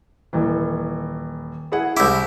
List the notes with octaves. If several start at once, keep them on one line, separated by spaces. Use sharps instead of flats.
D#1 E3
E4 G#4 F#5
C2 E4 D6 G6